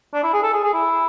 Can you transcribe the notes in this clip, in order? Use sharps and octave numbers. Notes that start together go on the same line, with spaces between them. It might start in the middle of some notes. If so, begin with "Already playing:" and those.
D4
E4
G#4
A4
G#4
G#4
E4